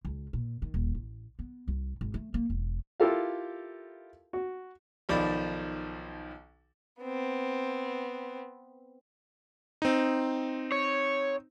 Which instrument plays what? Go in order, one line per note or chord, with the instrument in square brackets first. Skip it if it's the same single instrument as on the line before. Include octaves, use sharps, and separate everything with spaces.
[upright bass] C#2
A#2
D#3
D#1
A1
B3
C2
G#1
A3
A#3
E1
[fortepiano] E4 F4 G4 A4 A#4 F5
F#4
[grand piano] B1 D#3 F3 D5 B5
[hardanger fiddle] B3 C4
[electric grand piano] C4 D#4
[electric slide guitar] C#5